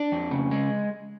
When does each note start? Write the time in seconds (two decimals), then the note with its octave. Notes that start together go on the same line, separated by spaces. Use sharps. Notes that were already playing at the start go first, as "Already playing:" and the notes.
Already playing: D4
0.12 F2
0.31 C#3
0.51 G#3